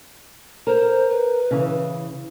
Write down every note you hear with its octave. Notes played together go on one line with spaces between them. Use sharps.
A#4 C5
B4
C#3 E3